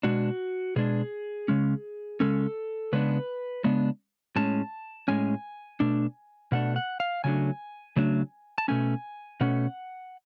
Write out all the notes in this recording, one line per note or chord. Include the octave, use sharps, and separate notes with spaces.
B2 G#3 D4 F#4
B2 G#3 D4 G#4
C#3 G#3 C#4
C#3 G#3 C#4 A4
C#3 G#3 B3 D4 B4
C#3 G#3 B3 D4
A2 G#3 C#4 A5
A2 G#3 C#4 G#5
B2 A3 D4
B2 A3 D4 F#5
F#5
F5
C#3 F#3 A3 D4 G#5
C#3 F#3 A3 D4
A5
B2 A3 C#4 G#5
B2 A3 C#4 F#5